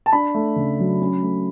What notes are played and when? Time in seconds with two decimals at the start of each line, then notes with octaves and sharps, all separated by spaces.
0.06 A5
0.13 D4 B5
0.34 A3
0.56 C#3
0.79 F#3
1.01 C#4
1.22 A3